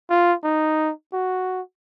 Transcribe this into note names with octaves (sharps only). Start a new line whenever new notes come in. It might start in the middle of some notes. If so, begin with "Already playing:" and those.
F4
D#4
F#4